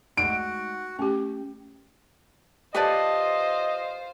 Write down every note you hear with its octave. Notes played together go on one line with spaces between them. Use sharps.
G#3 A3 D#4 F#4 F#5 D7
A3 C#4 G4 G5
F4 G4 B4 C5 D5 D#5 G5 A5